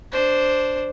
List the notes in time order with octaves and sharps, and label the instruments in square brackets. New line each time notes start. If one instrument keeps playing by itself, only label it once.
[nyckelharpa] D4 C5